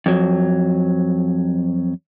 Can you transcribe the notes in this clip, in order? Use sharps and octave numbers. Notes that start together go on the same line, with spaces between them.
F2 F#3